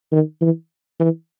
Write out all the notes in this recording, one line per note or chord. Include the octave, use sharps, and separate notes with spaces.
D#3
E3
E3